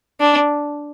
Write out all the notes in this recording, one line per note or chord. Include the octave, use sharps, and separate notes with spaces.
D4